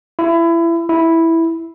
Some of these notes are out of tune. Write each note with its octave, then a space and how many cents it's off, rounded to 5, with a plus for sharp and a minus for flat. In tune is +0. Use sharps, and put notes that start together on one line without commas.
E4 +25
E4 -5